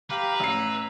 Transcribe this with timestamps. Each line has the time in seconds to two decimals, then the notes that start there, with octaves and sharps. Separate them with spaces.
0.10 G4 B4 F5 A#5
0.40 A1 E6 C7